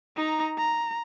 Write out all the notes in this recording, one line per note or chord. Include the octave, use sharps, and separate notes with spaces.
D#4 A#5
A#5